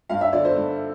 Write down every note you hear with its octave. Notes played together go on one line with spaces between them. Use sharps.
G2 F5
E5
D3 D5
C5
G2